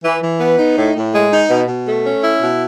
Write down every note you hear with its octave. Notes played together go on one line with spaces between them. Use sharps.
E3
E3
B3
D#4
A2
A2
G#3
D#4
B2
B2
A3
C#4
E4
B2